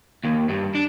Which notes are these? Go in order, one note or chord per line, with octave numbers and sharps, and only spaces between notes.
D#2
G2
D4